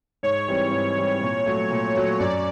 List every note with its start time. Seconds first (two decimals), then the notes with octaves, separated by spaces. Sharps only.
0.23 G#2 C#5
0.48 E3 G3 C4
0.72 G#2
0.97 E3 G3 C4
1.21 A#2
1.46 F#3 A3
1.70 A#2
1.95 F#3 A3
2.19 F#2 D5